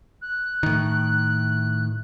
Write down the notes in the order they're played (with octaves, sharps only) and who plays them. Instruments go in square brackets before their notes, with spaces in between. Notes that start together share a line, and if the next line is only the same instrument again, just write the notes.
[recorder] F#6
[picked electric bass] A2 D#3